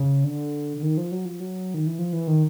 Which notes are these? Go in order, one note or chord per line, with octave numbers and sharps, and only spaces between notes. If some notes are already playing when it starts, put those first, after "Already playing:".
Already playing: C#3
D3
D3
D#3
F3
F#3
F3
F#3
D#3
E3
F3
E3
D#3